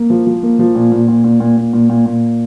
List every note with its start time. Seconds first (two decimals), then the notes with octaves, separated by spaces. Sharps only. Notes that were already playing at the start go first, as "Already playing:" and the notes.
Already playing: A#3
0.10 F3
0.27 F3
0.43 A#3
0.59 F3
0.75 A#2
0.92 A#2
1.08 A#2
1.24 A#2
1.40 A#2
1.57 A#2
1.73 A#2
1.89 A#2
2.06 A#2